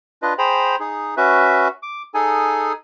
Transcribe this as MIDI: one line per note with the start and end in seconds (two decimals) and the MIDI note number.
0.22 0.33 62
0.22 0.33 65
0.22 0.33 71
0.22 0.33 75
0.38 0.76 68
0.38 0.76 72
0.38 0.76 79
0.38 0.76 82
0.38 0.76 83
0.80 1.15 63
0.80 1.15 68
1.17 1.68 61
1.17 1.68 66
1.17 1.68 71
1.17 1.68 76
1.83 2.03 86
2.14 2.73 63
2.14 2.73 68
2.14 2.73 69
2.14 2.73 80